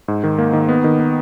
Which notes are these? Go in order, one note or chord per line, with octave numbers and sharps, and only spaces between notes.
G#2
D#3
A#3
D#3
B3
D#3
B3